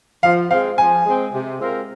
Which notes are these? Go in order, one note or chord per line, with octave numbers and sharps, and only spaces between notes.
F3 F5
G#3 C4 F5
F3 G#5
G#3 C4
C3
G#3 C4 F4 A#4